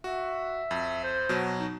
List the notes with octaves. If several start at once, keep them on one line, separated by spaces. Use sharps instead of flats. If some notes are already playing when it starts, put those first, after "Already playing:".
F#4 E5
F2
C5
B2 F#3
D#4